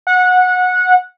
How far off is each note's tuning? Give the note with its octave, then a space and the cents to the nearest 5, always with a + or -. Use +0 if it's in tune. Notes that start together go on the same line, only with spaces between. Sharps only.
F#5 -20